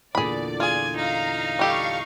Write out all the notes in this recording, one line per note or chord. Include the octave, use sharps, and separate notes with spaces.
E2 A#2 D3 G#4 D5 B5
F4 G#4 G#5
D#4 F5 A#5
G3 G4 A4 F5 C#6